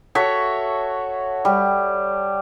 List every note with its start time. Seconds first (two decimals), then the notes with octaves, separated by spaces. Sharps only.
0.15 F#4 A4 C#5 E5
1.45 G3